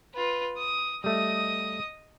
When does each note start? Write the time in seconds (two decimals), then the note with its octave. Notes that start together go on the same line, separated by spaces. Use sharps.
0.14 F4 B4
0.58 D#6
1.04 G3 A3 D#5 D#6